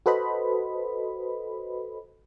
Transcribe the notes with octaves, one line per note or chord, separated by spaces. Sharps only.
F#4 A4 B4 C5 D#5 B5